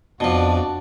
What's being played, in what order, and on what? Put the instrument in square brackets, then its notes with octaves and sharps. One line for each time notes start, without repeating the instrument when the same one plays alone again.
[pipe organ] F2 [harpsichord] B2 F3 [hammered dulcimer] D4 A5 D6 [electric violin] F#4 D5